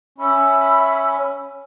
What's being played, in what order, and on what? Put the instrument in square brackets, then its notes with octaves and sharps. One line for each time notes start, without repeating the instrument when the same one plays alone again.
[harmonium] C#4 [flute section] E5 B5 E6